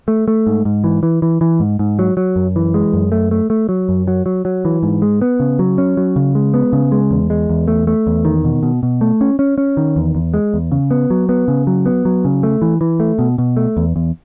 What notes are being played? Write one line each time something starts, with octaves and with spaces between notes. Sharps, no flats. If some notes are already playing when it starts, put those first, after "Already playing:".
A3
A3
G#2
G#2
E3
E3
E3
E3
G#2
G#2
F#3
F#3
F#2
E3
G#3
F#2
A3
A3
A3
F#3
F#2
F#3
F#3
F#3
E3
G#2
G#3
B3
C#3
F#3
C#4
F#3
C#3
G#3
B3
C#3
G#3
E2
G#3
E2
A3
A3
E2
D#3
B2
B2
B2
A3
C#4
C#4
C#4
D#3
E2
E2
G#3
E2
C#3
B3
F#3
B3
C#3
F#3
B3
F#3
C#3
A3
E3
E3
A3
B2
B2
A3
E2
E2